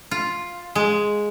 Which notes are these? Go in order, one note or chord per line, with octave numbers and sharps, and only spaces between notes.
F4
G#3